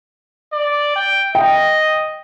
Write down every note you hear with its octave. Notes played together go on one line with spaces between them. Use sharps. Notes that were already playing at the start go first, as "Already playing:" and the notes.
D5
G5
D#5 G5